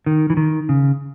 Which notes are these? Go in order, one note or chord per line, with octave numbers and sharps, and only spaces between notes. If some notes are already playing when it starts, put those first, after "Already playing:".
D#3
E3
D#3
C#3